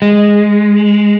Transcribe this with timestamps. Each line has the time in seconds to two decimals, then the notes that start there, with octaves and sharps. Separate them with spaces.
0.02 G#3